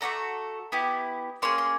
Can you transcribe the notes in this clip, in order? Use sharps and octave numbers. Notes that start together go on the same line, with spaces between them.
A3 D4 F#4 A4 A#5
B3 E4 G4
A#3 C#4 G#4 C6
C6